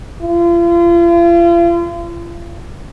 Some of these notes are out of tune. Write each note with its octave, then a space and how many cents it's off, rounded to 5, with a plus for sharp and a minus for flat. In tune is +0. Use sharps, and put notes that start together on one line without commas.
F4 -40